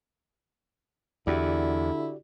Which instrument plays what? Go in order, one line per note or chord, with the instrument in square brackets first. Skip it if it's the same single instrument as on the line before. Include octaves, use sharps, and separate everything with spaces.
[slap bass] E2 [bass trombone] D3 [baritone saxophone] E4 [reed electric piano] F#4 G4 D5